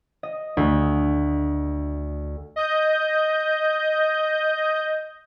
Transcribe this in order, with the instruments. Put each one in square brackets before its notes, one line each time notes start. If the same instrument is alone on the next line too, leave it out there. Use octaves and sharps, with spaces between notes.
[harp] D#5
D2
[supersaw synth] D#5 G6